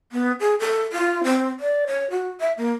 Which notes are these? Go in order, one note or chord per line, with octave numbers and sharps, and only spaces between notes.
B3
G#4
A4
F4
C4
D5
C#5
F#4
E5
A#3